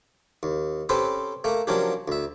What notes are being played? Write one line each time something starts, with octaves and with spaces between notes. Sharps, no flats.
D#2
C4 C#4 G4 A4 B4 C5
A3 A#3
F3 F#3 A#3 C#4 D4 G4
D2 E5